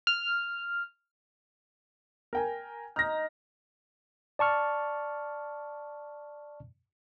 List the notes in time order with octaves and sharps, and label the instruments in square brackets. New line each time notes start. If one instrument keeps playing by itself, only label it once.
[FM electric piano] F6
[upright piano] A#4 G5 G#5
[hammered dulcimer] D#4 [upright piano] F6 A#6
[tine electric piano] D5 A5 C#6 F6